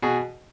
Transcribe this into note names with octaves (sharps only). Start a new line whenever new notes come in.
B2 F#4 G#4